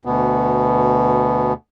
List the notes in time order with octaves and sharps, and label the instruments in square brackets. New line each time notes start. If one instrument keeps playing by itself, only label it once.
[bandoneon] D2 B2 B3